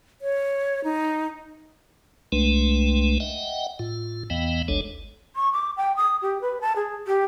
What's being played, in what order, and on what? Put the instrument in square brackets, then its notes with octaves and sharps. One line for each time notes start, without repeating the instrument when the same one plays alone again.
[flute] C#5
D#4
[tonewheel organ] C2 G#3 A3 D4 B4
D#5 E5 F#5 G5
A2 F4
E2 E3 B3 D#5 F5 G5
G#1 D2 G#3 D4 A4 C#5
[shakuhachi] C#6
D6
G5
D#6
G4
B4
A5
G#4
G4